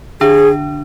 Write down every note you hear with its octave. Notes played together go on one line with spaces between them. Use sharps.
D3 D4 G#4